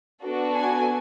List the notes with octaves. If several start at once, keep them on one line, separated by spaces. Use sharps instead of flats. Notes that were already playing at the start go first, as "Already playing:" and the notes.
B3 D4 F#4 A4
G#5